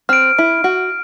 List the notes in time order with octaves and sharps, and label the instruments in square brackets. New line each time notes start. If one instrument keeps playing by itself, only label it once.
[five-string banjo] C4 [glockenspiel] F6 D7
[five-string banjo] E4
F#4